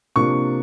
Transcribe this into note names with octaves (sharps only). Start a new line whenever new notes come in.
C3 F3 A#3 D4 C#6